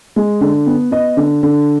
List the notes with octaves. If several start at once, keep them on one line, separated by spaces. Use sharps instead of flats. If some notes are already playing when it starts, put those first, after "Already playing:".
G#3
D3
B3
B3 D#5
D3
D3